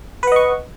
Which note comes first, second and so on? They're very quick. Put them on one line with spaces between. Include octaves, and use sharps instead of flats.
B4 F#5 D#5 C#6